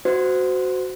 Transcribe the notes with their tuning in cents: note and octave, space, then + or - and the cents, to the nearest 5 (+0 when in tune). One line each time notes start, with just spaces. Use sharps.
F#4 +0 C5 -25